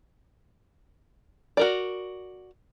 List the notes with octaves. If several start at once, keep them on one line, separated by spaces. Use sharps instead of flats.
F#4 A#4 D5